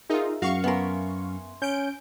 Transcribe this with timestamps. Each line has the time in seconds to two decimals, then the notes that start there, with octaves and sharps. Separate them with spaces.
0.10 D#4 F4 G#4 A#4 E5
0.42 F#2 F#4 F5 C#6
0.64 B3 A#4 E5 G#5 C6
1.62 C#4 G6 D7